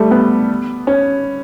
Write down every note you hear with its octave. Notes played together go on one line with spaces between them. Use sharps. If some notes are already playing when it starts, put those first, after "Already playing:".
Already playing: G3 A3
B3
C#4